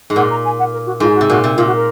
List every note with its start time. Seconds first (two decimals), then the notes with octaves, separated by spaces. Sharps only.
0.10 G#2
0.16 A#2 F#5
0.30 A#5
0.45 G#5
0.59 F#5
0.73 A#4
0.86 F#4
1.00 G#2 F4
1.08 G#4
1.15 F#4
1.21 C3
1.29 A#2 F#4
1.44 C3
1.56 A#2 F4
1.66 F#4
1.75 A#4